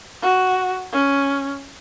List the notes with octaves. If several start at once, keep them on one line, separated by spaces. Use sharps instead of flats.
F#4
C#4